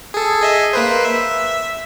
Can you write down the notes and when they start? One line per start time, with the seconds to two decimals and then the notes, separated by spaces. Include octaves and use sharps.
0.14 G#4 A4
0.41 G#4 D#5 E5
0.73 A#3 B4 C5
1.05 E5